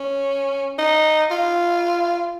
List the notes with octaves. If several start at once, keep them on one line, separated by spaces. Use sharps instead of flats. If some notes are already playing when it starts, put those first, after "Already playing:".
Already playing: C#4
D#4
F4